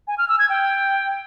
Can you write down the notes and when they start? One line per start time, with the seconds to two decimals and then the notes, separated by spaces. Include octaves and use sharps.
0.08 G#5
0.18 F6
0.28 E6
0.39 G#6
0.49 G5